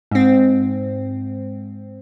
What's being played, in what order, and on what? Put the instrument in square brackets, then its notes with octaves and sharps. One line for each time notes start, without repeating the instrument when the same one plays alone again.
[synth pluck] G#2 C4